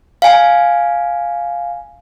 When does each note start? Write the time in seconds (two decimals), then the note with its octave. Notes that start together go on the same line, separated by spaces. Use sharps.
0.22 F5 G#5